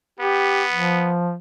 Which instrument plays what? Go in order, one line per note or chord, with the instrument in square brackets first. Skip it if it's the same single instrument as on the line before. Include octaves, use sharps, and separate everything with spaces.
[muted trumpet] B3 [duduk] G4
[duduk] F3